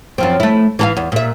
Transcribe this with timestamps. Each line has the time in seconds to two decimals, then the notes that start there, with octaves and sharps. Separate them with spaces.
0.18 F#2 F3 C4
0.40 A3 E4
0.79 E3 A4 F5
0.97 E2
1.12 A#2 E5